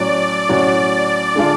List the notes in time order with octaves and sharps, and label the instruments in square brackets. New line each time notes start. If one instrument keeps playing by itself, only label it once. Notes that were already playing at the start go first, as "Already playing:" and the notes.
Already playing: [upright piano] A2 F#3 C#4 F#4 [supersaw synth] D5
[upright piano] A2 F#3 C#4 F#4
D3 G#3 D4 F4